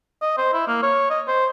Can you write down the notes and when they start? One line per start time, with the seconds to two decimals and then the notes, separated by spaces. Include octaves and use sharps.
0.21 D#5
0.37 C5
0.53 E4
0.67 A#3
0.82 C#5
1.10 D#5
1.27 C5